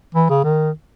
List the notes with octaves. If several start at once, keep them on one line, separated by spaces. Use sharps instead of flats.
E3
C#3
D#3